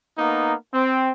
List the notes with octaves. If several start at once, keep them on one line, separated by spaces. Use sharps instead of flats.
A#3 B3 D#4
C4